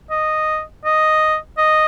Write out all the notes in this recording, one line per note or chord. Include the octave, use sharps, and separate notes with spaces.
D#5
D#5
D#5